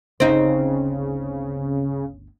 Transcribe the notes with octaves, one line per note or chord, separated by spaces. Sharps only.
G1 D2 C#3 C4 D#4